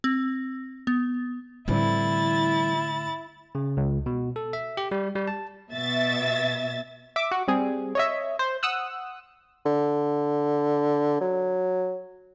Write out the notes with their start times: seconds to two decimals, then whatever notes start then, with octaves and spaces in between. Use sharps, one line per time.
0.04 C4
0.87 B3
1.68 A2 D3 E3 G3 C4 E4 A6
3.55 C#3
3.77 C#2
4.06 B2
4.36 A4
4.53 E5
4.77 G4
4.91 G3
5.15 G3
5.28 A5
5.72 B2 E5 A6
7.16 E5 D6
7.31 F#4
7.48 G3 C4 G#4
7.95 C#5 D#5 E5
8.39 C5
8.63 F#5 D#6 E6 F#6
9.66 D3
11.21 F#3